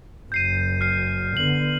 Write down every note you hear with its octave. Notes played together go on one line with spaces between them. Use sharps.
F#1 F#2 G6 C7 D#7
F6 C7
D3 B3 F#7